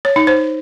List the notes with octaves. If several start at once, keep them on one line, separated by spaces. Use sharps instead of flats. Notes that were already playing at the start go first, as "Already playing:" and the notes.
C#5
D#4
C5